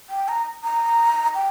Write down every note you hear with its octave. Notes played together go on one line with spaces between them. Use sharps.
G5
A#5
A#5
G5